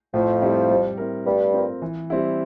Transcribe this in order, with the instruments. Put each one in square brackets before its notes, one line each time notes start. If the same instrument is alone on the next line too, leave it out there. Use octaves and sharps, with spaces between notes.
[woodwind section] F2 F3 [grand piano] A2
[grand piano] G3 C4 E4
G3
C4 E4 A#4
[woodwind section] G2 G3 [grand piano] A3
[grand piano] C4 F4 A#4
E3
G3 C4 E4